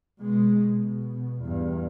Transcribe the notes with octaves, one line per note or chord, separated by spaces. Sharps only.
B2 G#3
B2
E2 G2